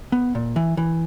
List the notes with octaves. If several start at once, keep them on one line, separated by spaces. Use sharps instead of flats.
B3
A#2
E3
E3